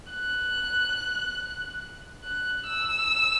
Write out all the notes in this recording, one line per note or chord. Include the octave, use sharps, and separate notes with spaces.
F#6
F#6
E6